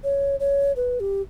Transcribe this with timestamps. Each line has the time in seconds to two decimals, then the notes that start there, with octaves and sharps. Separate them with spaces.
0.04 C#5
0.40 C#5
0.76 B4
1.00 G4